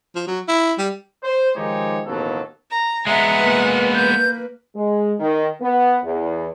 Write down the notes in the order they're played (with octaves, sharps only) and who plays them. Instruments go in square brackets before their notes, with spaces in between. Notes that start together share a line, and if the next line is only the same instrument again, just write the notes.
[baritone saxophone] F3
F#3
E4
G3
[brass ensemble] C5
D#3 F3 G#3 D#4 G4 C#5
A1 D#2 B2 F3 F#3 A4
[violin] A#5
[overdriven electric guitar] G#3 B3 [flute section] E5 A#5 [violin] F#5 G#5
[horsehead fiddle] A#3 B4
[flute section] G6
[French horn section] G#3
D#3
B3
E2